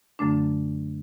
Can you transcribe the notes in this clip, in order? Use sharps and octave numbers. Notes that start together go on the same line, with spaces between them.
F#2 D3 F#3 A3 D4